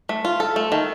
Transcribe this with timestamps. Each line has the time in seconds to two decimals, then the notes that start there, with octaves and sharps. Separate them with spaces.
0.09 A3
0.25 F4
0.40 A4
0.56 A3
0.72 D#3